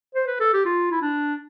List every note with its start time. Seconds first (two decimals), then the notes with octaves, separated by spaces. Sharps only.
0.15 C5
0.27 B4
0.40 A4
0.53 G4
0.65 F4
0.91 E4
1.02 D4